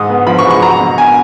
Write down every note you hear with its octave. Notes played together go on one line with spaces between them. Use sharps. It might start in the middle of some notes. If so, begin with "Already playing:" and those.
Already playing: G#2 D#6
B3
F3 B5
C#6
G#2
C#6
F#3 A#5
B2
G#5